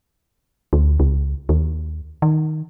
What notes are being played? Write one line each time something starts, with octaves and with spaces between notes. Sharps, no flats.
D2
C#2
D#2
D#3